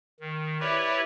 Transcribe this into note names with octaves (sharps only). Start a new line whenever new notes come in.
D#3
E4 G4 B4 C#5 D5 E5